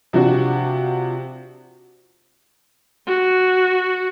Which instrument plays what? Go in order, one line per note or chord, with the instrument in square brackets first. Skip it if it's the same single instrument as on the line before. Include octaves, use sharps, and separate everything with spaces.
[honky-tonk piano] C3 F3 D4 F#4
[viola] F#4